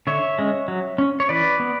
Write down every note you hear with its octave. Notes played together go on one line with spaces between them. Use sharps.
D3 C#5 E5
G#3 C#4
F#3
C#4
C#5
E3 B4 D5
B3